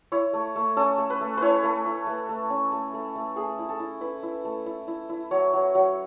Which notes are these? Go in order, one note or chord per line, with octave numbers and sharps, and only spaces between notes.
E4 C#5
A3
A3
C#4 A4
A3
B4
A3
E4 B4 C#5
A3
E4
A3
A3
C#4
A3
A3
A3
A3 G#4
E4
A4
E4
E4 B4
E4
A3
E4
E4
E4
F#3 C#5
F#3
F#3